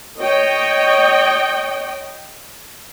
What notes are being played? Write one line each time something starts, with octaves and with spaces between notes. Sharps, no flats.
C#5 D#5 G5